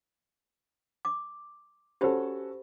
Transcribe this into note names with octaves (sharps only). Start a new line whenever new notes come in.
D6
C#4 F#4 G4 A4 C5 B5